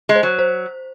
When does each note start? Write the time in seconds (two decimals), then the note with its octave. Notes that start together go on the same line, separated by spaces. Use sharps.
0.09 G#3
0.16 C5
0.23 F#3
0.39 C5